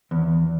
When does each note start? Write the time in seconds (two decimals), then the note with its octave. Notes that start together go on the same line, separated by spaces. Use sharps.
0.11 E2